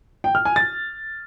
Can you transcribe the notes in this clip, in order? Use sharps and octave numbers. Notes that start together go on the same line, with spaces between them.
G5
F6
G#5
A6